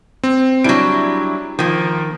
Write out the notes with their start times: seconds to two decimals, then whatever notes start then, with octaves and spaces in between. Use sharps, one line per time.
0.24 C4
0.64 F#3 G3 D4 E4 D7
1.59 D#3 F3 A#3